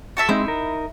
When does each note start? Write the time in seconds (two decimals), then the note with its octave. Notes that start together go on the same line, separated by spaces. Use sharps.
0.17 F#4 A4 E5
0.29 G#3 C4 D#4 E4
0.45 D#4 A#4